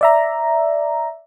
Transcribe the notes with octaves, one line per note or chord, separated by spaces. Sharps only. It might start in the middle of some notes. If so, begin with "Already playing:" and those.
D5 E5 A#5